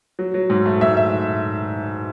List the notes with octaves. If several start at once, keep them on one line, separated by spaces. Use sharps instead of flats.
F#3
F#3
G#2
A3
G#2 E5
E5